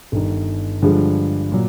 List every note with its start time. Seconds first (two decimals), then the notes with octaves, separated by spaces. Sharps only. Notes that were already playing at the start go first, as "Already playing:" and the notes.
0.12 G1 G2 D#3
0.82 G2 D3 F3 G#3
1.52 A#2 F#3